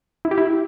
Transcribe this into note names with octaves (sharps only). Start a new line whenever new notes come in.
E4
G4
E4